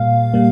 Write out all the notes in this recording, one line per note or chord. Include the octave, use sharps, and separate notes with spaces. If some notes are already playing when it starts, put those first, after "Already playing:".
Already playing: A#2 G3 A#3 F5
A#2 G3 A#3